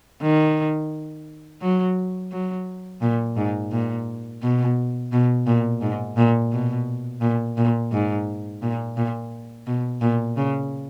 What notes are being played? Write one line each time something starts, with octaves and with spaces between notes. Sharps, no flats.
D#3
F#3
F#3
A#2
G#2
A#2
B2
B2
A#2
G#2
A#2
B2
A#2
A#2
G#2
A#2
A#2
B2
A#2
C#3